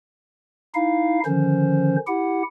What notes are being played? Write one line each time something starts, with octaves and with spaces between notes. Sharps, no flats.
D#4 E4 F5
D3 D#3 F3 C#4 C5
E4 G4 F#5